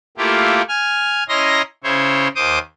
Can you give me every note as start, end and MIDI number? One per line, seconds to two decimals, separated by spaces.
0.18 0.62 57
0.18 0.62 58
0.18 0.62 64
0.18 0.62 65
0.18 0.62 67
0.68 1.24 80
0.68 1.24 89
1.28 1.62 61
1.28 1.62 64
1.28 1.62 75
1.28 1.62 82
1.28 1.62 84
1.28 1.62 94
1.84 2.28 49
1.84 2.28 64
1.84 2.28 72
1.84 2.28 73
2.35 2.59 39
2.35 2.59 72
2.35 2.59 86
2.35 2.59 87